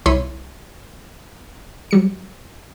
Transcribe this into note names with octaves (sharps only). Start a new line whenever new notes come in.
C2 E4 C#5 C6 B6 D#7
F#3 G3 C#7